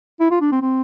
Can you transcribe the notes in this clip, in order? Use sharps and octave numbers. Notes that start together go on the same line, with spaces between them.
E4
F4
D4
C4
C4